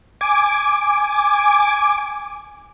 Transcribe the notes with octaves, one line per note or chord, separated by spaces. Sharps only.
G#5 D6